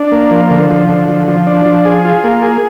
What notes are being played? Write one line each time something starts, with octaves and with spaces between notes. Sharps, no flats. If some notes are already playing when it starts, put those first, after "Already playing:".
Already playing: D4
A#3
F3
D3
F3
D3
F3
F3
D4
F3
G#4
F4
A#3
G#4